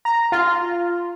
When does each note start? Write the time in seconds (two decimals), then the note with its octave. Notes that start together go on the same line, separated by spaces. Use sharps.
0.05 A#5
0.32 F4